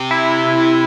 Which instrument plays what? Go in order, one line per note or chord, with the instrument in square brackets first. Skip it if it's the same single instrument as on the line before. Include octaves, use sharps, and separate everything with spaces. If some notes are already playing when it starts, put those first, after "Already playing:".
Already playing: [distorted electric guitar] C3
[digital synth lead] E4